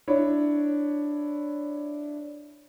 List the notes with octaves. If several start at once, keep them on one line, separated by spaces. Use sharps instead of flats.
D4 E4 C#5